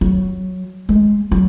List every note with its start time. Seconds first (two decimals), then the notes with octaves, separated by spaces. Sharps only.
0.01 F#3
0.89 G#3
1.32 F#3